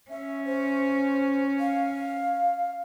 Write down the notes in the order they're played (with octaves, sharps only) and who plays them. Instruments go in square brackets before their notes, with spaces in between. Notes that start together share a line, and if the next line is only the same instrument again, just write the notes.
[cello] C#4 [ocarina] E5
[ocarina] C5
F5